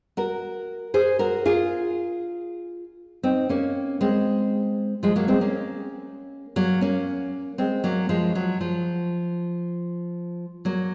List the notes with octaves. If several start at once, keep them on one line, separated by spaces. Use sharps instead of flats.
F#4 A#4
G#4 C5
F#4 A#4
F4 G#4
C4 D#4
A#3 C#4
G#3 C4
F3 G#3
F#3 A#3
G#3 C4
A#3 C#4
F#3 A#3
A#3 C#4
G#3 C4
F#3 A#3
F3 G#3
F#3
F3
F#3 A#3